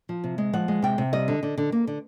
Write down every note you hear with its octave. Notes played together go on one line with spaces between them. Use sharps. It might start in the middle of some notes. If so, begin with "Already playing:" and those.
F3
C3
G#3
F3 F#5
G#3
C3 G5
C3
G3 D#5
D3
D3
D3
A#3
D3